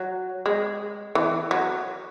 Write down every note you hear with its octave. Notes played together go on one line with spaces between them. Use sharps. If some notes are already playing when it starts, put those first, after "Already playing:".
Already playing: F#3
G#3
E3
F#3